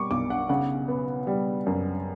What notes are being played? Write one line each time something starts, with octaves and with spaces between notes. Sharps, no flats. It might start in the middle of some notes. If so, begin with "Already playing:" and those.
Already playing: B2 G3 C#6 D6
B1 D6
F#5
C#3 F#5
B3
G3
F#2